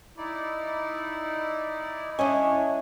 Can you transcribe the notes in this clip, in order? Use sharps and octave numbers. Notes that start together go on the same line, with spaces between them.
D#4 E4 D5
C#4 D4 E4 D#5